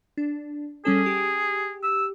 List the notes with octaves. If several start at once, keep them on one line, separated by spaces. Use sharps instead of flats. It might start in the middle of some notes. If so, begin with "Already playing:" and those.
D4
G3 C#4 G#4 A4
G4
E6